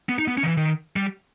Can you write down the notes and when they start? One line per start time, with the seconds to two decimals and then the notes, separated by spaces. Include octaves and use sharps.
0.09 B3
0.19 D#4
0.28 B3
0.38 C#4
0.43 D#3
0.47 E3
0.57 D#3
0.96 G3